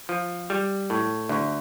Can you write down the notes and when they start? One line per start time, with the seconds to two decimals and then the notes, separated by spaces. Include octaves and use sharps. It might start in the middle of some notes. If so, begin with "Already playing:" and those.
0.09 F3
0.50 G3
0.90 A2
1.29 D2